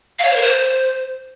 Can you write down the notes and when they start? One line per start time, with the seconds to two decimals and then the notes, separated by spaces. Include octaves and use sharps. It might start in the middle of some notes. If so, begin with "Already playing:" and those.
0.19 F5
0.25 C#5
0.30 C5
0.36 A#4
0.42 C5